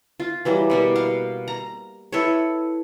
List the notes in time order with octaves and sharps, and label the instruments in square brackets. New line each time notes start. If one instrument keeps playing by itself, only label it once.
[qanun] F4
E3 F#3 G3
B2 G3 A#3
F5
A#5
E4 A4 B4 C#5